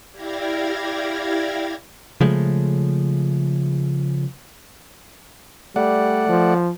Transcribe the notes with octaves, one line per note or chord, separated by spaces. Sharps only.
E4 G4 D5 F5 G#6 A#6
C#3 F3 G#3 A3
G3 A3 D5 F#5
F3